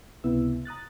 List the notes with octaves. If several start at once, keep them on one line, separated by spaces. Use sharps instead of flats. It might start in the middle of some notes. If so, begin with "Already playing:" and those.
C#2 C3 B3 E4 E6
A#5 D#6 F#6 A6